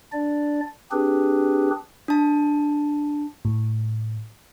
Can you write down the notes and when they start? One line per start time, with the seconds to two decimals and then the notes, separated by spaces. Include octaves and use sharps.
0.12 D4 D5
0.91 C4 D4 G4 G#4 B4
2.08 D4 A5
3.45 A2